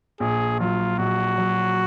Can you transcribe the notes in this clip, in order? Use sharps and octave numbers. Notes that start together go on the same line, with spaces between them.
A#1 G#4
F#3 F4
A#1 F#4
F#3